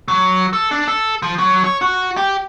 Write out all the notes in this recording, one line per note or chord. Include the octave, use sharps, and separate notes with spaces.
F#3
A4
D4
A4
F3
F#3
C#5
F#4
G4